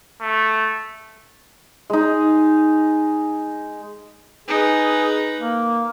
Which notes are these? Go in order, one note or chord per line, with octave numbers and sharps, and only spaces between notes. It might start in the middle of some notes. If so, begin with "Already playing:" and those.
A3
G#3 D#4
D#4 G#4 B4
A#3